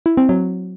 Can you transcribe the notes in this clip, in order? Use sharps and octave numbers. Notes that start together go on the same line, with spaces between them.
E4
C4
F#3